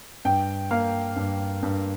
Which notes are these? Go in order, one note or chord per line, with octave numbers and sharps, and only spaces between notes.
G2 G5
A#3 F5
G2
G2